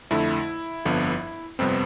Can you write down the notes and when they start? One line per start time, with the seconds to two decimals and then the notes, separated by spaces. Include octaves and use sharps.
0.11 F2 D3 A3 E4
0.85 G1 F2 D3 F3 B3
1.59 G1 F2 C3 G3 B3 C4